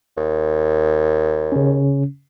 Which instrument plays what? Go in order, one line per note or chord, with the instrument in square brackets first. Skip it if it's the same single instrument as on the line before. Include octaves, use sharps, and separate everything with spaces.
[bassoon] D#2
[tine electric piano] C#3 C#4